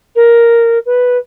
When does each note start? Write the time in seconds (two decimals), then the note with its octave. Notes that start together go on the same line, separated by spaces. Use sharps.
0.15 A#4
0.85 B4